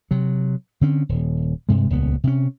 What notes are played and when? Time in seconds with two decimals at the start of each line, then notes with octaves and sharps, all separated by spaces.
0.11 C3 F#3
0.81 D3 C4 C#4
1.09 D#1
1.69 G2 C3 G#3
1.90 D#1 C#2 B3
2.24 C3 C#4